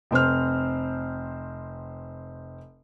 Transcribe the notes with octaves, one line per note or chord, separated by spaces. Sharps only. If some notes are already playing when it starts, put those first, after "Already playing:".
F1 C4 C5 F6